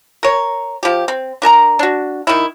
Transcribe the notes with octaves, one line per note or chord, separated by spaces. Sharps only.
A#4 C#5
F3 G4
C4
D4 A#4 A5 A#5
D4 F#4
D#3 E4